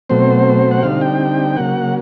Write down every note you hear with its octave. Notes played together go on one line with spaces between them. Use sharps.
B2 F#3 A3 C4 C5
F#5
D3 G3 C4 D#4 F5
G5
C#3 F#3 A#3 F#5